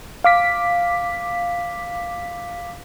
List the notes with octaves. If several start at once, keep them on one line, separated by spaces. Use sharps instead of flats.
F5 D6 B6